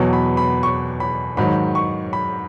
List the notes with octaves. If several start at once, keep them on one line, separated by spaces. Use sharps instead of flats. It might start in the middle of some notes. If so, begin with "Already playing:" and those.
Already playing: E2 B2 F#3 C#6
B5
B5
C#6
B5
G#2 D#3 F#3 B5
C#6
B5